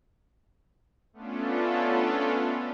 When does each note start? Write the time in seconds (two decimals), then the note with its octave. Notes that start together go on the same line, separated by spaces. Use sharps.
1.13 A3 B3 C#4 D4 F4 A4